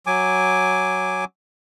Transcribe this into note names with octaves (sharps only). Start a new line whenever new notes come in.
F#3 G#5 D6